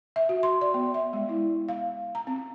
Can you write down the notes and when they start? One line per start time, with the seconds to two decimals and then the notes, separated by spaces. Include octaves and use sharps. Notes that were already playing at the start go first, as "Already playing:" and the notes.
0.16 E5
0.29 F#4
0.43 C6
0.61 D5
0.74 B3
0.94 E5
1.13 G#3
1.29 E4
1.69 F5
2.15 A#5
2.27 C4